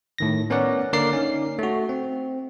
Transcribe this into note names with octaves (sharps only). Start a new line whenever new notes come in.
A2 D#3 A#6
B3 C#4 A#4 C#5 D5 F#5
D3 A#3 A#4 D5 F5 C7
C#4 D#4
A3 F#4
C4